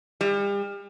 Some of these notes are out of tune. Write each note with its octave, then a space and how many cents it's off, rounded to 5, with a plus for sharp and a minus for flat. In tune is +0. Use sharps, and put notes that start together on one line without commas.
G3 +40